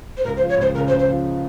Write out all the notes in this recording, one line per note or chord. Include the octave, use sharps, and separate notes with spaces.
C5
C#2 A#4
C5
F3
C#5
C#2 C5
C#3 A#4
C5
C#2
C5
F3